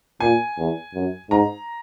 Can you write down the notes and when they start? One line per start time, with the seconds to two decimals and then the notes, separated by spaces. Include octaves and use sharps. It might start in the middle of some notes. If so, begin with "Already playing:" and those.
0.20 A#2 G#5
0.58 E2
0.94 F#2
1.30 G#2 A#5